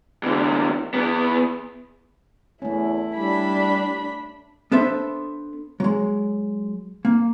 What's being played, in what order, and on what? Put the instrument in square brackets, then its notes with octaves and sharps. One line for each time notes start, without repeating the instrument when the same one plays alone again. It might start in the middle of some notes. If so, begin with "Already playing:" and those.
[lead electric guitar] E2 D3
E2 B3
[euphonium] E2 [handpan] A3 C#4 [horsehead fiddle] E4
[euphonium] G3 [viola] D4 B5
[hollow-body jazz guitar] B3 D4 A4 C5 E5
F#3 G#3
A#3